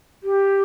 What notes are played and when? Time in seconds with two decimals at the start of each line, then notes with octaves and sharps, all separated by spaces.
0.23 G4